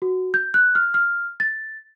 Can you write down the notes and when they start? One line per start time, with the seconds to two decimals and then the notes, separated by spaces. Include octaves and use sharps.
0.02 F#4
0.34 G6
0.54 F#6
0.75 F6
0.94 F6
1.40 A6